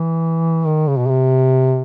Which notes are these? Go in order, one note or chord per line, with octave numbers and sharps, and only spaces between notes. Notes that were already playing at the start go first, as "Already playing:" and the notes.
Already playing: E3
D#3
C#3
B2
C3